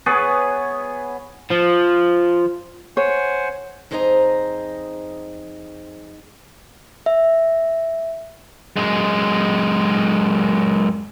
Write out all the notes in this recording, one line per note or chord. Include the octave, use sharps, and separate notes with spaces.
B3 G#4 B4 C#5
F3
C5 C#5 F#5 G#5
F2 D#4 G#4 C5 D#5 A#5
E5
F#2 G#3